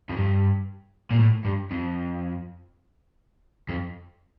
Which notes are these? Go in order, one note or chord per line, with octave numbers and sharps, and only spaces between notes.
F2
G2
A#2
A2
G2
F2
F2